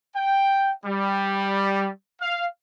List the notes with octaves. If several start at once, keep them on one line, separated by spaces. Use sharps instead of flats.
G5
G3
F5